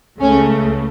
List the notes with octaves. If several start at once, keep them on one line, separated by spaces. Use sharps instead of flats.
C#2 C#3 A3 C#4